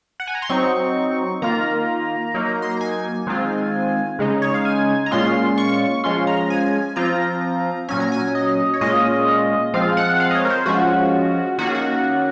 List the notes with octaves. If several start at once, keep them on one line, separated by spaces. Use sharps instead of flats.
F#5
G#5
A#5
C6
F#3 C4 D#4 C#6
D#3 A#3 F4 A#5
F#3 A#3 D#4
C6
A#5
G#5
D#3 G#3 C4 F4
C#3 G#3 D#4
C#5
F5
G#5
A#5
A#2 G#3 C#4 F4 C6
C#6
F3 G#3 C#4 F4 C6
A#5
G#5
F3 C4 F4 A#5
A#2 F#3 C#4 G#5
A#5
G#5
D#5
C#5
A#2 G#3 C#4 F4 D#5
F3 G#3 C4 F4 F5
F#5
F5
D#5
C#5
A#4
C5
F3 G#3 C#4 F4 F#4
D#3 A#3 C#4 F4 F#4
G#4
F#4